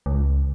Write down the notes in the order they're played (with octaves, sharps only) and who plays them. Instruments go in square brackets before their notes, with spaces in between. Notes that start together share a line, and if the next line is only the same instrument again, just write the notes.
[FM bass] C#2